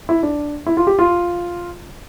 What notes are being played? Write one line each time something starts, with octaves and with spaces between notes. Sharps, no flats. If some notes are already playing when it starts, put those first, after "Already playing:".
E4
D4
E4
F4
G4
F4